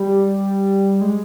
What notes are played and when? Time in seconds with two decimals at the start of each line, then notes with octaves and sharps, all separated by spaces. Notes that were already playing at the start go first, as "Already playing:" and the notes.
Already playing: G3
1.01 G#3